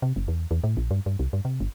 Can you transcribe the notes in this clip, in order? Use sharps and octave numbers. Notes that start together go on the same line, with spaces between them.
C3
F#1
E2
E2
A2
A#1
G2
G2
C2
G2
C3
G1